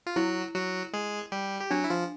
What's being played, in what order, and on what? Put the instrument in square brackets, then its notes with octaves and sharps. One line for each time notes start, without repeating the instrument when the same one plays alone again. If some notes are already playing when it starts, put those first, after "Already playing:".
[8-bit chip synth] F4
[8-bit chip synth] F#3 F#4 [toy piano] E4
[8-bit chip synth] F#3 F#4
G#3 G#4
G3 G4
G4
[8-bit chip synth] F#3 F#4 [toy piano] D4
[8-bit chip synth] E4
F3 F4